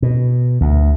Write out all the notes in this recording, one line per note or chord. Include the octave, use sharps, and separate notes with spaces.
B2
D2